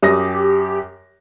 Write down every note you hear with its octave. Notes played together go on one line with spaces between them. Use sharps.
F#2 G4 D#6 A#6